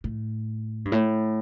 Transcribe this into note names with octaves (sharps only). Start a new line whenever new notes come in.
A2
G2
A2